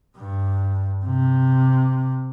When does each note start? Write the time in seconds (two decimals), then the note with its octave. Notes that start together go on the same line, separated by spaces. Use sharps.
0.17 G2
1.05 C3